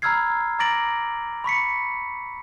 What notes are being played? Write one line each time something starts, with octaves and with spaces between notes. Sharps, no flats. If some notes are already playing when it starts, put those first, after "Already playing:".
A#5 B5 E6 F6 G#6 C7
A#5 D6 A6 A#6 D7 F#7
B5 C#6 B6 C#7